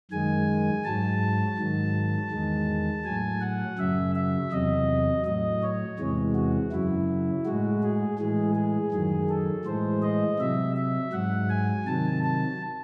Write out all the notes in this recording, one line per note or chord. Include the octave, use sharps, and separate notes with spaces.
F#2 D#3 G#3 G#5
G#2 F#3 A5
G#2 D#3 F#3
E2 D#3 G#3
A2 F#3 G#5
F#5
F#2 C#3 F#3 E5
E5
E2 C3 F#3 D#5
A2 F#3 D#5
C#5
E2 C3 E3 G#3
F#4
F#2 C#3 F#3 E4
A2 G#3 F#4
G#4
A2 E3 G#3 G#4
G#4
F#2 D#3 F#3 G#4
A4
A2 E3 G#3 C5
D#5
C3 F#3 E5
E5
G#2 F#3 F#5
G#5
C3 D#3 F#3 A5
A5